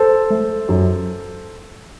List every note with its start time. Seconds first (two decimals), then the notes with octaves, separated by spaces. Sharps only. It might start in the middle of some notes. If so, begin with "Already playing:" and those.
Already playing: A4 C5
0.30 A3
0.69 F#2